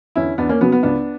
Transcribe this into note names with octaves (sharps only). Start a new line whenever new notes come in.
E2 D3 C#4 E4
E2 B3 D4
A#3 C#4
C#3 F#3 B3
B3
C#2 B3 D4